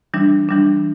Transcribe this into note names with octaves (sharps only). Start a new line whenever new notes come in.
E3 G3 D4
E3 G3 D4